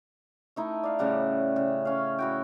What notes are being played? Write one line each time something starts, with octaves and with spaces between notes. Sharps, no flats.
A3 D#4 E4
D5 F5
A2 C#3 G3 F#5
C#3
C#4 F5
E4 F#4 G5